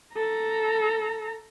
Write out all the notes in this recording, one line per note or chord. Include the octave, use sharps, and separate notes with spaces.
A4 A#5